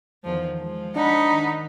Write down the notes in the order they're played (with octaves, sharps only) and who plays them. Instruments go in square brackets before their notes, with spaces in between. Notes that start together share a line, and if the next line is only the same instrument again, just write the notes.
[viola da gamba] E2 D#3 F3
F3 G#3
[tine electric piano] D4 [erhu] D#4 [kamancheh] F#5 B5
[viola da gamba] D#3